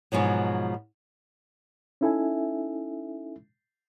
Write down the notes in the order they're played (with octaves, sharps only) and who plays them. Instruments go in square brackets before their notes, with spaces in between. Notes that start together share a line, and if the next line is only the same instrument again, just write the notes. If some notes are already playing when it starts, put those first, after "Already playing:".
[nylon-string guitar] G#2 B2 F3 F#3
[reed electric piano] C#4 D#4 E4 A4 E5 G#5